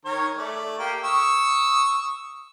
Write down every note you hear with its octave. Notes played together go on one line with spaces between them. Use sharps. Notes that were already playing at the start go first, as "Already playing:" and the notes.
D#3 A#4 C#5
A3 D5
A#3 G4
C#6 D#6 E6